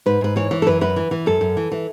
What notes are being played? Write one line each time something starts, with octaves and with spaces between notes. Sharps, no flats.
G#2 B4
G#2 B4
E3 C#5
E3
A4
F#2 B4
F#2 B4
E3
E3
F#2 A4
F#2
E3
E3